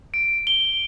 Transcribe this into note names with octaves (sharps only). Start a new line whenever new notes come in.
D7
G7